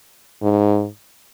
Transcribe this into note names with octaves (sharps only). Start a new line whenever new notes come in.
G#2